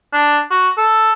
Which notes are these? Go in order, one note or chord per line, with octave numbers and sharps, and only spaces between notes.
D4
F#4
A4